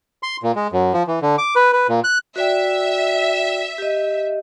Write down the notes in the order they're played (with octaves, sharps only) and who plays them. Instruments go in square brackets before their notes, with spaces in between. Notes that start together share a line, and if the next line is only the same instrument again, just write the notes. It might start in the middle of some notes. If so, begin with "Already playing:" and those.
[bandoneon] C6
A#2
G#3
F#2
F3
E3
D3
D6
B4
B4
A#2
F#6
[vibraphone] F#4 D5 G5 [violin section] E5
[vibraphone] G4 D#5